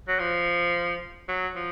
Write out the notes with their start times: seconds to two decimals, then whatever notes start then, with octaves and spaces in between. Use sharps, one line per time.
0.08 F#3
0.19 F3
1.28 F#3
1.55 F3